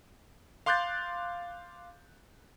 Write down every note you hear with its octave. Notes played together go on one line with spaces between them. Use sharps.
F5 C6 D6 F#6 G6 A6